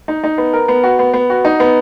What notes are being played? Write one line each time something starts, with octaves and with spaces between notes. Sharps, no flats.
D#4
D#4
B3
A#4
B3
F#4
B3
B3
F#4
D#4
B3